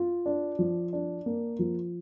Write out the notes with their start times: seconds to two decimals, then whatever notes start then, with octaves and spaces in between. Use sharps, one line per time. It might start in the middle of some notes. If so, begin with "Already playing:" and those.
Already playing: F4
0.26 D4
0.59 F3
0.93 D4
1.26 A#3
1.59 F3